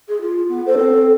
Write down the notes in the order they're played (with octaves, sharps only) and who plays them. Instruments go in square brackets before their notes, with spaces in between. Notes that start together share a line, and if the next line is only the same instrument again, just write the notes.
[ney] G#4
F4
B3
[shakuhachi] A4 [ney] C5
[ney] C4